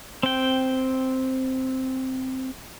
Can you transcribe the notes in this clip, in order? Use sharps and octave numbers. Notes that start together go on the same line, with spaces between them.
C4 G5